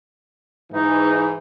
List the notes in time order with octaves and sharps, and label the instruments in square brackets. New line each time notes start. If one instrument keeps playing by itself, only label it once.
[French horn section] G#2 E3 [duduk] D#4